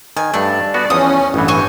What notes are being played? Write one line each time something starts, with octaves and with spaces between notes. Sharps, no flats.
D#3 G#5
G2 A3 D4
B3 F#4 D5
E2 F3 F#3 C#4 D#6
A1 G2 E3 B3
G#5 C#6 G6